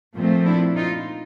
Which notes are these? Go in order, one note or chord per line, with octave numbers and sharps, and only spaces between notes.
A#2 F3 A3 C4
D4 E4
D#4 F4